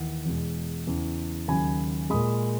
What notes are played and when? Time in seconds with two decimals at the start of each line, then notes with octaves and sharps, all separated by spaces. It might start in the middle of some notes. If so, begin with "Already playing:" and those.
Already playing: D#2 E3 F#5
0.25 E2 B2 G#3
0.87 E2 C#3 E3
1.48 D#2 C#3 F#3 G#5 B5
2.10 A#2 G#3 B5 D#6